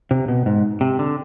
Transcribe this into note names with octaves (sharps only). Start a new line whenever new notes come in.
C3
B2
G#2
C3
D3